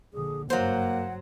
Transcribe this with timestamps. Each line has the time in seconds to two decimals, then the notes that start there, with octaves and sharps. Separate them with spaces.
0.14 A#1 D3 G#4
0.50 F#1 G2 F#3 A#3 C5 F#5